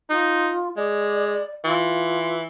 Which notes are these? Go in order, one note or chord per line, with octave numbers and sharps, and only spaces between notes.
D#4 F4
G#3 D5
E3 F4